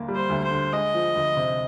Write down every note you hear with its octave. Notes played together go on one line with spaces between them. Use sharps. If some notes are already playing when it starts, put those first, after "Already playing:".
Already playing: D2 D3 A#3
G3
C5
D2
C5
D3
G#3 D#5
F3
D2
C3